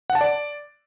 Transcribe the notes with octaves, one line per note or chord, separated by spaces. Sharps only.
F#5
A5
D5